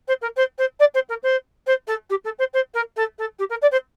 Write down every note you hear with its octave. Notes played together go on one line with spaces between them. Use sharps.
C5
A#4
C5
C5
D5
C5
A#4
C5
C5
A4
G4
A4
C5
C5
A#4
A4
A4
G4
A#4
D5
C5